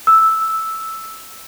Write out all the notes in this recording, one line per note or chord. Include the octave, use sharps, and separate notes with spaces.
E6